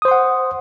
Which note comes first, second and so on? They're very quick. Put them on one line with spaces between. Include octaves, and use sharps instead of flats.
D#6 C5 C6 F#5